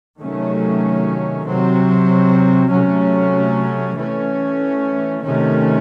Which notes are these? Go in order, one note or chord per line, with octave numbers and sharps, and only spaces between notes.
C3 D#3 F#3 A3 C#4
C3 F#3 C4
C3 F#3 A3 C#4
E3 A3 C#4
C3 D#3 A3 C#4